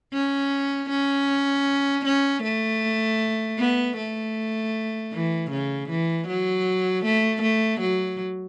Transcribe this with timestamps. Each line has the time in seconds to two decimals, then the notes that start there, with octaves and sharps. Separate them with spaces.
0.13 C#4
0.90 C#4
2.05 C#4
2.43 A3
3.59 B3
3.97 A3
5.13 E3
5.51 C#3
5.90 E3
6.28 F#3
7.05 A3
7.43 A3
7.81 F#3